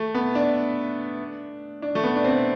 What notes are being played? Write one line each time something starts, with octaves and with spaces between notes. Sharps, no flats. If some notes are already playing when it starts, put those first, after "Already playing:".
Already playing: A3
B3
D4
D4
A3
B3
D4
C4